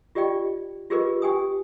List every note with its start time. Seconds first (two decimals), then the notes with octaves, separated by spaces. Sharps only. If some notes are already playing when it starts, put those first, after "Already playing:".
0.15 F4 G4 D5 D#5 G5
0.90 F4 G4 G#4 A#4 B4 D#5
1.22 G4 G5 G#5 D#6